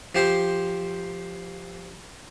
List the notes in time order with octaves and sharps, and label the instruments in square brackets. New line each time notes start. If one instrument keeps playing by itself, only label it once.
[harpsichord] F3 G4 C5